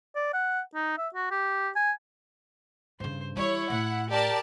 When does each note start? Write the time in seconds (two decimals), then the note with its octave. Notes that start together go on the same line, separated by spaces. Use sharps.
0.16 D5
0.34 F#5
0.75 D#4
0.98 E5
1.15 F#4
1.31 G4
1.76 G#5
3.00 G2 C#3 C5
3.37 E3 G3 E4 C#5
3.70 A2 F#5
4.10 G4 A#4 D5 A5